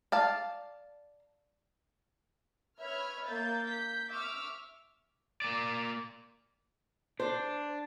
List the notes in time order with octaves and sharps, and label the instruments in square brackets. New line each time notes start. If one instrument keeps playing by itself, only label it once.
[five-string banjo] D5 F5 A5
[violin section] B4 C#5 E5 B5 F6 G#6
A#3 E5 G6 A6
G6 B6
E5 C#6 D6 E6 F6
[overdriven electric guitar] A#3 D5
[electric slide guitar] D4 [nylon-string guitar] C5